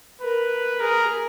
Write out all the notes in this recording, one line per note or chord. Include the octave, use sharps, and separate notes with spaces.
A#4 B4
G#4 A#4